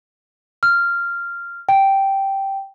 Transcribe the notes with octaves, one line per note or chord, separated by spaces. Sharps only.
F6
G5